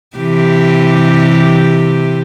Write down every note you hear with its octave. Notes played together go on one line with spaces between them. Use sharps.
C3 E3 G4